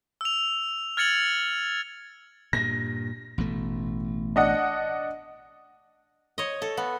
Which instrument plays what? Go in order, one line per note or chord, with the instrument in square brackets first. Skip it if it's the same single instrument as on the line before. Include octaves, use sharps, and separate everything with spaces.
[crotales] E6 F7
F6 G#6 A6 C#7 F7 F#7
[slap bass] G2 A#2 [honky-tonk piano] A#6
[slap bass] A1 B2 A3
[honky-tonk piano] D4 D#5 F#5
[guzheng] C#5 D#5
A4
B3